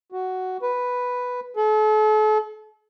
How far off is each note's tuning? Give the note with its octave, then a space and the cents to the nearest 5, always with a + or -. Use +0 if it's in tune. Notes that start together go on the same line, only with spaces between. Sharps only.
F#4 +5
B4 +0
A4 -40